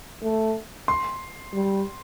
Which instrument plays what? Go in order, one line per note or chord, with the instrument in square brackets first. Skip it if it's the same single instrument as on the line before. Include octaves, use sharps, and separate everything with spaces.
[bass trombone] A3
[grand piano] C6
[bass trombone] G3